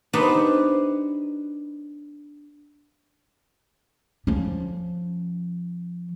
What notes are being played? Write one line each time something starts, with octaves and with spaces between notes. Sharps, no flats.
B3 D4 D#4 G4 B4 C5
F3 C#4